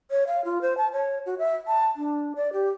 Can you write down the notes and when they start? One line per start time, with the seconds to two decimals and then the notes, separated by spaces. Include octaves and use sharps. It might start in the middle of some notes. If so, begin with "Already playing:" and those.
0.11 C#5
0.27 F5
0.45 F4
0.61 C5
0.77 A5
0.93 C#5
1.26 F#4
1.39 E5
1.67 A5
1.96 D4
2.36 D5
2.53 G4